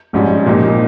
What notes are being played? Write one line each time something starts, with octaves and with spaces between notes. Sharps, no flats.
A#1 G#2 G3 C#4
A#2 F3 A#3 D#4 G4